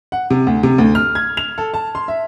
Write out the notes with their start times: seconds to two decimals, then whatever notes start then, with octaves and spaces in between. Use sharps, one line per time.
0.12 F#5
0.30 C3
0.47 D2
0.63 C3
0.78 D2
0.95 F6
1.15 G#6
1.37 F7
1.58 A4
1.74 A5
1.95 C6
2.08 E5